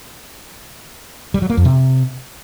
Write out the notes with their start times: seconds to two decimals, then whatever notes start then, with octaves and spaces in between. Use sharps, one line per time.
1.34 G3
1.42 F#3
1.50 A#3
1.57 F2
1.65 C3